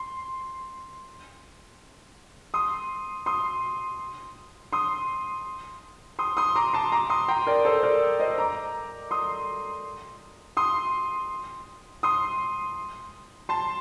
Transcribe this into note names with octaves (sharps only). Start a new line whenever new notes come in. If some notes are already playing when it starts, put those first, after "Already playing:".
Already playing: C6
C6 D#6
C6 D#6
C6 D#6
C6 D#6
C6 D#6
A#5 D6
A5 C6
A#5 D6
C6 D#6
G5 A#5
A#4 D5
A4 C5
A#4 D5
C5 D#5
A#5 D6
C6 D#6
C6 D#6
C6 D#6
A5 C6